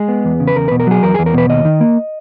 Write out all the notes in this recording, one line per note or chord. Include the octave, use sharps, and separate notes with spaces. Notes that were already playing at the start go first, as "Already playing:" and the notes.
Already playing: G#3 G#4
B3
E2
C#3
B4
E2 A#4
B2 B4
A#4
F#3 G#4
E2 A#4
E2 G#4
A#4
B2 B4
D#2 D#5
D#3
A#3